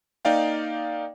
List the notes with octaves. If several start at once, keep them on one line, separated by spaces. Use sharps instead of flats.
A#3 D#4 D5 F5 G5